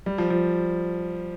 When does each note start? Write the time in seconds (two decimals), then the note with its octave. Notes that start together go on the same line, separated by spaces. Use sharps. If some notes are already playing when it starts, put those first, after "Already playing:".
0.06 G3
0.18 F3
0.30 F3